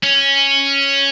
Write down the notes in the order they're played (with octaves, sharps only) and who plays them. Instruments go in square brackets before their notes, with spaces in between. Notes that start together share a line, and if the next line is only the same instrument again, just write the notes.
[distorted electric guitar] C#4